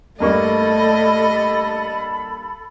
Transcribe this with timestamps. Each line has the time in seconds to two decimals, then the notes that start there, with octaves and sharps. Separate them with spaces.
0.20 G2 A3 A#3 A4 D#5 B5 C#6